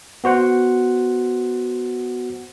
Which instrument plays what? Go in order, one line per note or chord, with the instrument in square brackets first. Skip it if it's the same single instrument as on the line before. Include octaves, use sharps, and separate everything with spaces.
[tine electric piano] B3 F#4 C5 F#5